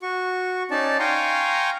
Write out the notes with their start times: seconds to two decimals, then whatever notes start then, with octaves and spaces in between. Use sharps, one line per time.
0.02 F#4 C#6
0.71 C#4 D#4 D5 A5
0.99 F5 G5 G#5 A#5 C6 C#6